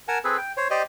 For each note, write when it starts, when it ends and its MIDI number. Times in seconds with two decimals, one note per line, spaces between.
0.08 0.18 70
0.08 0.18 78
0.08 0.18 80
0.08 0.18 81
0.24 0.37 60
0.24 0.37 68
0.24 0.37 69
0.24 0.37 71
0.37 0.52 79
0.57 0.68 72
0.57 0.68 73
0.71 0.83 67
0.71 0.83 72
0.71 0.83 74
0.71 0.83 75